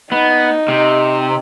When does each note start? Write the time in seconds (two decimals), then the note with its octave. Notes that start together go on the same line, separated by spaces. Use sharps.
0.12 B3 D#4
0.68 C3